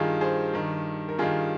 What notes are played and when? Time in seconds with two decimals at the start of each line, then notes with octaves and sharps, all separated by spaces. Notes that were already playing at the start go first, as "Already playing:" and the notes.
Already playing: G2 D#3 F4 G#4
0.21 G#4 C5
0.54 G2 D#3
1.09 A#4
1.19 G2 D#3 F4 G#4